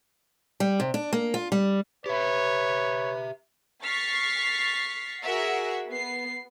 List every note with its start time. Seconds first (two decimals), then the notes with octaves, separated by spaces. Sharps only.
0.60 G3
0.80 C3
0.94 D4
1.13 A#3
1.34 F4
1.52 G3
2.06 G4 B4 C#5 E5
3.84 C#6 F6 A6 B6 C7
5.23 F#4 G#4 A#4 E5 F#5
5.88 B3 C7